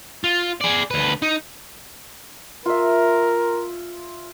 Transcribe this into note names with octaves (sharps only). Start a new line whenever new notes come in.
F4
G#4 D5
D2 B4
D#4
F4 A#4 E5